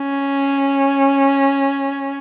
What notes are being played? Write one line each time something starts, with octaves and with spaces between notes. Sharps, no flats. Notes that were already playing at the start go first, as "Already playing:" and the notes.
Already playing: C#4